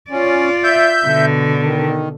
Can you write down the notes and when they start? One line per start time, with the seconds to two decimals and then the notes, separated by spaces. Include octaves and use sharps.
0.11 C#4 F4 D5
0.64 E5 G6
1.07 B2 D3
1.64 D#3